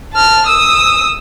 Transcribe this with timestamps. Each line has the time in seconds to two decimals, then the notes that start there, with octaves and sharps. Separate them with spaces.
0.14 A5 F6
0.47 D#6 E6